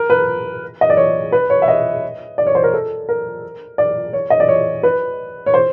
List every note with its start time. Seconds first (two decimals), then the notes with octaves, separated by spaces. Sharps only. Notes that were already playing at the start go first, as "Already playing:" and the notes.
Already playing: A#4
0.10 B4
0.81 D#5
0.90 D5
0.97 C#5
1.32 B4
1.50 C#5
1.62 E5
1.68 D#5
2.38 D5
2.47 C#5
2.55 C5
2.64 A#4
2.73 A4
3.09 A#4
3.78 D5
4.13 C#5
4.30 D#5
4.40 D5
4.48 C#5
4.83 B4
5.46 C#5
5.54 C5